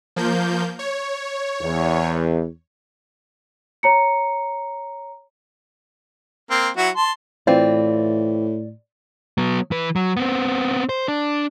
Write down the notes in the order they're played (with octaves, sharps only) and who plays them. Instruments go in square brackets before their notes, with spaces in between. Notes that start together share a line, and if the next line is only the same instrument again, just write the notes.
[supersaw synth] F3 A#3 G6
C#5
[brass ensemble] E2
[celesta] C#5 A#5 C#7
[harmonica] A#3 C4
F#3 E4 F#4
A5 C6
[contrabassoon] A2 [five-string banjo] E3 C4 F4 [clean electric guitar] D5
[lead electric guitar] F#3 B3
E3 B4
F#3
B3 C4
C5
D4